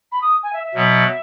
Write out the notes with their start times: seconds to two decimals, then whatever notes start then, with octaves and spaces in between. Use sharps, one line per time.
0.11 B5
0.21 D#6
0.43 G#5
0.53 E5
0.64 E5
0.75 B2 F#3 B3